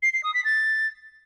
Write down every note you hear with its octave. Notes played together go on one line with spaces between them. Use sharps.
C7
C7
D#6
B6
A6